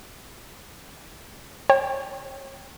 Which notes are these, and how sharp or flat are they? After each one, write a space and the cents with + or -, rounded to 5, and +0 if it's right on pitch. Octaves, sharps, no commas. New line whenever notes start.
C#5 -35 G5 +0